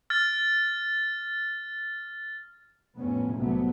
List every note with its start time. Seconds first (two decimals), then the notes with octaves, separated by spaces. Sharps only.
0.10 F6 A6
2.97 A#1 F2 A2 B3 C#4
3.35 C2 C3 F#3 A3 B3